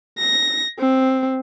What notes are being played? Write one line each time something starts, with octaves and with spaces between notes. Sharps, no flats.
A#6
C4